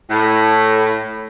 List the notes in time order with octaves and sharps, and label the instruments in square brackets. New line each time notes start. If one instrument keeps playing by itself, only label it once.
[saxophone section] A2